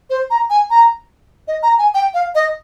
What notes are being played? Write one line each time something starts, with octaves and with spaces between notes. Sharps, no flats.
C5
A#5
G#5
A#5
D#5
A#5
G#5
G5
F5
D#5